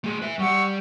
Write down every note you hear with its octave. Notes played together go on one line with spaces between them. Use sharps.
A3 G#4
B4 E5
G3 G4 F#5 C#6 E6